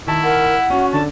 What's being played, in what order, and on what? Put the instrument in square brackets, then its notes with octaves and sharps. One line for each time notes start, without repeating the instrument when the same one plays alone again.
[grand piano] D#3 A5 [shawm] E4
[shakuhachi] A#4 [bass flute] F#5
[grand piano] C#4 [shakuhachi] F#4
[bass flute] D3 [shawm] A5